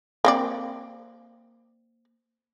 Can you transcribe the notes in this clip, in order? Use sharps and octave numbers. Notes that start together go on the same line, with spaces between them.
A#3 C4 D5